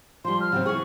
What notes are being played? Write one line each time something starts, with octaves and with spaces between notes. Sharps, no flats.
F3 G3 C6
F6
C#3 F#3 C4
E3 G#4 C#6